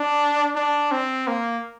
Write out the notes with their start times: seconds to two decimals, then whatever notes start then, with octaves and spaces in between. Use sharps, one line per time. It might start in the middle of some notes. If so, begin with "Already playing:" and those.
Already playing: D4
0.56 D4
0.91 C4
1.27 A#3